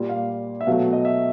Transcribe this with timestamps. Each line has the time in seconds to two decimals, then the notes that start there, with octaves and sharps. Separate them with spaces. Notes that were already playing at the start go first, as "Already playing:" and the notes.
Already playing: A#2 G3
0.09 F5
0.61 E5
0.67 B2 F#3 A3 F5
0.93 D#5
1.05 E5